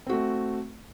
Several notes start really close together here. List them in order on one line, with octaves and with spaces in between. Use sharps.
C4 F#4 A3